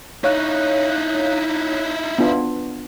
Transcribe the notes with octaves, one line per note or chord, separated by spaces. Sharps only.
D#4 E4 C#5 F5 F#6
B3 D4 F4